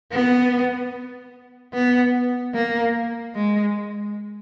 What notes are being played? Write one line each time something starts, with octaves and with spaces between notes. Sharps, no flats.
B3
B3
A#3
G#3